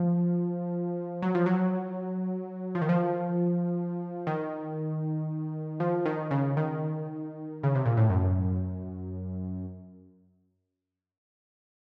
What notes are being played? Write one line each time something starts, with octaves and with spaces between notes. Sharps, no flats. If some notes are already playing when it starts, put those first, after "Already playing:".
Already playing: F3
F#3
F3
F#3
F3
D#3
F3
D#3
F3
D#3
C#3
D#3
C#3
C3
A#2
A2
F#2